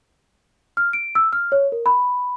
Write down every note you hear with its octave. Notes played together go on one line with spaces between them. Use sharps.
F6
D7
E6
F6
C#5
A#4
B5